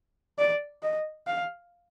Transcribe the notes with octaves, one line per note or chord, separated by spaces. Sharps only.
D5
D#5
F5